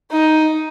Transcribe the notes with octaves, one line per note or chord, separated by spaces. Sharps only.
D#4